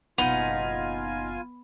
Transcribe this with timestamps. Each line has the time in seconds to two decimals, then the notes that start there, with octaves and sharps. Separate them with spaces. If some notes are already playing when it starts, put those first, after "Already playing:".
0.18 F#1 B2 B3 D#4 F4 G#5